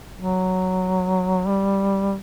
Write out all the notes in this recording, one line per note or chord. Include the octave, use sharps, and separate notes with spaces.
F#3
G3